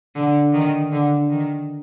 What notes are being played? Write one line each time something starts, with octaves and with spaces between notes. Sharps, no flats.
D3
D#3
D3
D#3